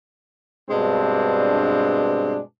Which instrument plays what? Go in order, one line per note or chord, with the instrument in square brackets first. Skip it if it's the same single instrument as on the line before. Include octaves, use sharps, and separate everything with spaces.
[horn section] G2 B2 G#3 C4 D4